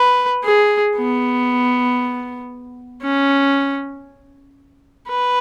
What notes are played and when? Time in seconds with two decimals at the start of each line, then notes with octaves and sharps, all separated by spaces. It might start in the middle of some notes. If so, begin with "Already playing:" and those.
Already playing: B4
0.44 G#4
0.96 B3
3.02 C#4
5.08 B4